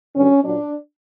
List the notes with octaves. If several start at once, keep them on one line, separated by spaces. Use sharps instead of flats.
G2 D3 F#3 C#4
A#2 F#3 D4